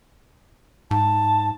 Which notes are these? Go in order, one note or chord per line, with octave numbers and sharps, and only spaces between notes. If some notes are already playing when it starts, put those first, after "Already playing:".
G#2 A5